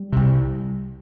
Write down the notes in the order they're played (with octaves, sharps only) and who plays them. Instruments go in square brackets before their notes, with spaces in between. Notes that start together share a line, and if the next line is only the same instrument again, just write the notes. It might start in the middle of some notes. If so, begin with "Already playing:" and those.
Already playing: [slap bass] G3
C2 C3